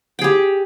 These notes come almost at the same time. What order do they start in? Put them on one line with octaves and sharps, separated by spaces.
G5 G#4 G4